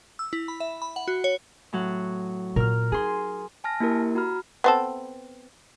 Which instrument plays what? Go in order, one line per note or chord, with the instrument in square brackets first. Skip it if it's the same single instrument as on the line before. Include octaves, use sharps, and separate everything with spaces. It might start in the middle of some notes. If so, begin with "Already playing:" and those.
[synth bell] E6
E4
B5
E5
B5
F#5
F#4
C#5
[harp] A2 F#3 F#5
[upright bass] A#2 [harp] A#4 F6
[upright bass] D#4 [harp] G#4 C6
[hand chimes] G#5 A5 F6 A#6
A#3 E4 G4 A#4
F#4 A#5 B5 F6
[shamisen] B3 C4 A4